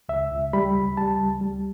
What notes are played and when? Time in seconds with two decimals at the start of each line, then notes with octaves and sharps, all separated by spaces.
0.09 C#2 E5
0.31 C#2
0.53 G3 B5
0.76 C#2
0.97 G3 A5
1.19 C#2
1.41 G3